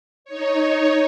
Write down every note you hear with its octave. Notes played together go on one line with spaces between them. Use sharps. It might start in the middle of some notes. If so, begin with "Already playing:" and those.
D#4 C#5